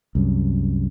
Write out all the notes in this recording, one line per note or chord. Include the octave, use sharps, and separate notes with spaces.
C2 F#2